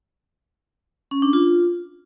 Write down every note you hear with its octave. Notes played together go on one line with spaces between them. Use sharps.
C#4
D4
F4